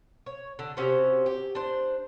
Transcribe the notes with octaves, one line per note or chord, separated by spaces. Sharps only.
C#5
D3
C3 C#4 F#4 C5
G4
D4 C5